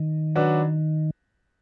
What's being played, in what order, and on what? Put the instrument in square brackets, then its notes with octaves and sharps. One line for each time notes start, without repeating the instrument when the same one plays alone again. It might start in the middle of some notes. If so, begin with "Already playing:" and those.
Already playing: [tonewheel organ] D#3
[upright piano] F#3 D4 F#4 B4